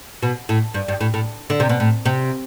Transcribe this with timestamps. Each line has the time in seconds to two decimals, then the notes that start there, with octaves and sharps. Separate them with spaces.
0.23 B2
0.49 A2
0.74 G2
0.88 G2
1.01 A2
1.14 A2
1.50 D3
1.60 C3
1.69 B2
1.80 A2
2.05 C3